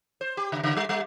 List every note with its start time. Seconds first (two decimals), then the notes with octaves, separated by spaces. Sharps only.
0.21 C5
0.37 G4
0.52 C#3
0.63 C#3
0.77 G3
0.89 G3